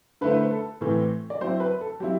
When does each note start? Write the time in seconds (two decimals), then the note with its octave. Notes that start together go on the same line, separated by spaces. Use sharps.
0.21 D3 A3 E4 B4
0.31 C5
0.40 B4
0.51 A4
0.81 A2 E3 A3 C4
1.30 D5
1.41 F#3 C4 E4 C5
1.60 B4
1.81 A4
2.00 F#3 C4 E4 G4